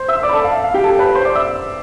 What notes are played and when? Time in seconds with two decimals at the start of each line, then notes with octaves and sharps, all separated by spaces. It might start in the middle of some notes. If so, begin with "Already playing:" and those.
Already playing: C5 C6
0.08 E5 E6
0.23 D5 D6
0.29 B5
0.33 A4 A5
0.44 F5
0.53 E5
0.64 F5
0.74 G4 G5
0.84 A4 A5
0.99 B4 B5
1.15 C5 C6
1.25 D5 D6
1.35 E5 E6